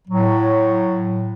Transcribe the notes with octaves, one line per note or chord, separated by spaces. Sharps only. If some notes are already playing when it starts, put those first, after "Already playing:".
A2 F#3